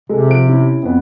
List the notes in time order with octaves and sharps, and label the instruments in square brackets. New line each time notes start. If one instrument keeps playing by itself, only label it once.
[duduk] C3 [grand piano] G#3 A4
[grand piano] F3 D7
C#4 E4
F2 B3